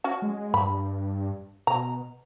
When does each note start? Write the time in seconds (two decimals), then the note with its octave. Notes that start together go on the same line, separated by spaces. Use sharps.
0.04 C#4 F#4
0.22 G#3
0.54 G2 B5
1.67 B2 A#5